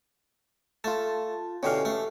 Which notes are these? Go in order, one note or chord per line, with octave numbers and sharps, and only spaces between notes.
A3 F4 A5
B2 D3 E3 C#4 G4 F5
A3